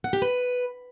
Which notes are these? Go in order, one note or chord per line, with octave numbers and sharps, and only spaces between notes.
F#5
G4
B4